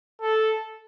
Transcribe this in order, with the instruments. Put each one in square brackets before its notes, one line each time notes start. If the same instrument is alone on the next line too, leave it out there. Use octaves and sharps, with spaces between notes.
[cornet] A4